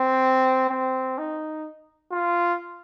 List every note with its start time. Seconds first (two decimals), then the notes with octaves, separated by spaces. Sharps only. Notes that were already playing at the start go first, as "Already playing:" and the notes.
Already playing: C4
0.69 C4
1.18 D#4
2.12 F4